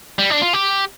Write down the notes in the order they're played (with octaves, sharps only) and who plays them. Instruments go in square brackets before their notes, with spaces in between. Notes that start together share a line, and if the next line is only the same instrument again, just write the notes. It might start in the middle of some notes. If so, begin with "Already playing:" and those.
[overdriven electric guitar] G3
D4
F4
G4